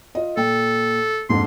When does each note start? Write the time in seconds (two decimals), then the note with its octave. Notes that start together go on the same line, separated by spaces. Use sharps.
0.15 F4 D#5
0.37 A#2 A4 G5
1.30 A#1 F2 G#2 C6